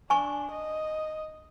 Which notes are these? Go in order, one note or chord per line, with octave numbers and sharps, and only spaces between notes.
D4 G#5 C#6
D#5